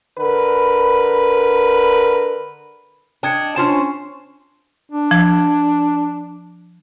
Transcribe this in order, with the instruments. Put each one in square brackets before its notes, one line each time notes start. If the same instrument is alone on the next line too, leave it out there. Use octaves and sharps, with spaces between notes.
[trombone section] D3 A#4 B4
[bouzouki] D4 D#5 [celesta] G5 G#6 C#7
[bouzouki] C#4 C5 A5 [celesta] D4 F4 E7
[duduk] D4
[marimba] F3